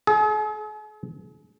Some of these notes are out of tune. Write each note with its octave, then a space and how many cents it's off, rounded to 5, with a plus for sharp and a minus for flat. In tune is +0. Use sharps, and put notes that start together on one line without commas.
G#4 +45